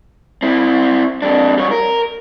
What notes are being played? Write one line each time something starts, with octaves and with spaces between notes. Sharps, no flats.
C4 E4
F2 D4
G3 C#5
A#4